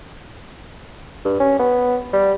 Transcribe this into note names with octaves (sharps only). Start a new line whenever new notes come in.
G2
C#4
B3
G3